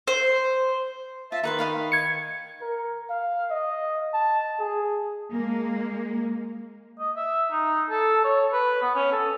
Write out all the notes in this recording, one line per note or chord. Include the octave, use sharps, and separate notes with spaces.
C5
F4 E5 A5
D#3 D#4 B4 C6
D#5 F5 B5
G#6 C#7
A#4
F5
D#5
A5
G#4
G#3 A#3
D#5
E5
D#4
A4
C#5
B4
B3
C#4
A4